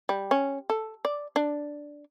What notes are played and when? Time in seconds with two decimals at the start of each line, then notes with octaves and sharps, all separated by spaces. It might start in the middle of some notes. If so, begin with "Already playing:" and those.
0.09 G3
0.31 C#4
0.70 A4
1.05 D5
1.36 D4